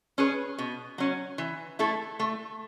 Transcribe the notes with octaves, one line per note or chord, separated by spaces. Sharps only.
C#4 G#4 B4
B2
F#3 C#4
E3
A3 E4 A4
A3